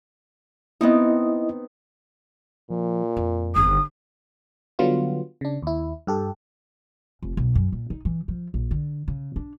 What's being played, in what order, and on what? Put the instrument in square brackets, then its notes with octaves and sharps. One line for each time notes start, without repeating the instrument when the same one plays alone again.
[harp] B3 C4 D#4 [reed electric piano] E4 D#5
[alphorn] A#2 [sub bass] F3
[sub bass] F2 [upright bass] F4
[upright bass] G1 D#3 [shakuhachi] D#6
[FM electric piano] D3 F#3 G3 B3 F4
C#3 D4
D#2 E4
G2 G4 A4
[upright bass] F1
B1
F#2
A#2
D#4
E3
F3
A#1
D3
C#3
D4